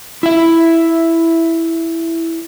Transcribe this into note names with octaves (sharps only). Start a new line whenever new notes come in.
E4 E5